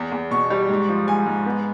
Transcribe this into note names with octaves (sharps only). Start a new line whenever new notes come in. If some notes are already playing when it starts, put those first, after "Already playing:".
Already playing: E2
E2
B2 C#6
G3
G#2
F3
G#2 G#5
G#2
B3